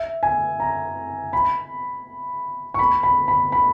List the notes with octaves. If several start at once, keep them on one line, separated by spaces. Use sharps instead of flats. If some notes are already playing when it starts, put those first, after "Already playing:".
Already playing: E5
G#5
A#5
B5
C#6
B5
B5
B5
B5